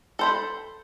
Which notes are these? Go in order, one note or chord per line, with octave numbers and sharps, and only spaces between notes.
A4 C5 B5